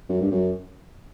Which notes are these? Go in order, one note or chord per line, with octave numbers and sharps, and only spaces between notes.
F#2
G2
F#2